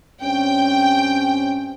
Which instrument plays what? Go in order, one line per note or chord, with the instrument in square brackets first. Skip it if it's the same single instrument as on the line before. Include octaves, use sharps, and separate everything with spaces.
[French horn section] G2 C4 C#4 [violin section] G5